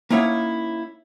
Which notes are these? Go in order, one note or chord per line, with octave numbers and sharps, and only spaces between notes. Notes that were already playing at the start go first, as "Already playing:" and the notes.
A#3 C#4 D#4 E4 C#5 F#5